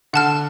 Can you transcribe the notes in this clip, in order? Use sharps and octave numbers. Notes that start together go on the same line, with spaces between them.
D3 F#5 A5 F6